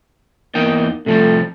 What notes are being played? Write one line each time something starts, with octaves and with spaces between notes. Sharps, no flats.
E2 A#3 D#4 G5
C3 F3 G3 A3